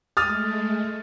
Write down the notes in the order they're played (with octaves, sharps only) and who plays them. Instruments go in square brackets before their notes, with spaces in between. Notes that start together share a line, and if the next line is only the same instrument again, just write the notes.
[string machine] G#3 A3 [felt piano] D#6 F6 A6